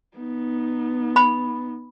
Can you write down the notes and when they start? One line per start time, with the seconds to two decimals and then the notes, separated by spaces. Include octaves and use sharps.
0.17 B3 D#4
1.16 B5